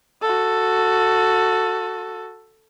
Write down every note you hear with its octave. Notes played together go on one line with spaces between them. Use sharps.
F#4 A4